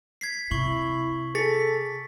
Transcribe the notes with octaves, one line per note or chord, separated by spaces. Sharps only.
G#6 B6 C7
C3 E4 C#6 F#7
G#4 A4 A6 B6